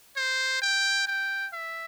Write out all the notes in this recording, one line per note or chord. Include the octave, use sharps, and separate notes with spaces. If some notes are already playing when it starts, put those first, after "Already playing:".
C5
G5
G5
E5